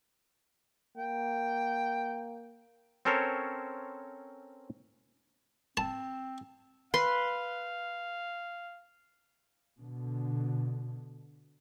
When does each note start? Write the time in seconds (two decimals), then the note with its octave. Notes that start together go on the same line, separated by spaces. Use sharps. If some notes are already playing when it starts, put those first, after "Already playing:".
0.98 A#3 G5
3.05 C4 C#4 A4 A#4 C5 C#5
5.77 C4 A5
6.94 B4 F5 C6
9.81 B2 D3